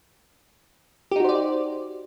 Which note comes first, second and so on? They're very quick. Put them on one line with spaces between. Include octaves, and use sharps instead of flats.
G4 D#4 F#4 C5 D5